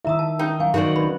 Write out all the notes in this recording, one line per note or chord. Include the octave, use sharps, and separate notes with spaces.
D#3 D#4 E4 E5 A#5 D#6
A5
C#4 D#4
F#3 F5 G#5
D#3 F#4 C5 D5
C#4 D4 B4 B5